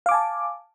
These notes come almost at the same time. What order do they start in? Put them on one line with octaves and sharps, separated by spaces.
F5 D6 G#5 A5